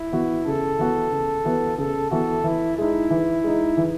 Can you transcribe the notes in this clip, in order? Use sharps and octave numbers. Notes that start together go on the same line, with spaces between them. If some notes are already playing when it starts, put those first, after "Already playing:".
Already playing: E4
E3 B3 F#4
C#3 A4
E3 B3 F#4
C#3
E3 B3 F#4
C#3 A4
E3 B3 F#4 A4
E3 E4
G#3 D#4 E4
E3
G#3 D#4
E3